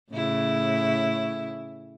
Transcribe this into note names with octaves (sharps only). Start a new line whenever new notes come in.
A2 C#3 E4